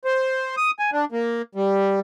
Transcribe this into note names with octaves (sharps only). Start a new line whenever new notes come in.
C5
D#6
G#5
D4
A#3
G3